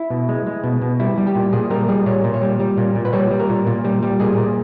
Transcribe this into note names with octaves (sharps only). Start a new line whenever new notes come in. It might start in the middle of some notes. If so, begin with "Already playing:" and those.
Already playing: E4
B2
G#3
G#3
B2
B2
G3 E4
G3
G4
A#2
A#2 G#4
G3 A#4
G3 G#4
A#2 C#5
A#2
C#5
G3
G3
A#2
A#2
B4
G3 C#5
G3
A#4
A#2
A#2
G3
G3
A#2 G#4
A#2